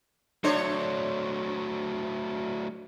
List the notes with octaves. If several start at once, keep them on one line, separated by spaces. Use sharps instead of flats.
F#3 A3 D4 C5 C#5